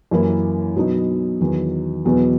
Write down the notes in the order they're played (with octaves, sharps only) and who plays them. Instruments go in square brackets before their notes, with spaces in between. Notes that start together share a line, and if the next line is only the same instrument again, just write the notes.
[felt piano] F#2 E3 A#3 E4
B2 F#3 B3 D#4
E2 D#3 F#3
E2 B2 F#3